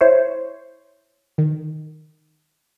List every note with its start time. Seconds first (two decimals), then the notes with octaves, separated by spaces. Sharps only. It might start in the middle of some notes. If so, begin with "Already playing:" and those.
0.01 E4 C5 C#5
1.38 D#3